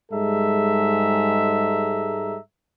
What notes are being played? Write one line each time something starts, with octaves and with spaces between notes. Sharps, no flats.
G#2 G3 G#3 A4 E5 A#5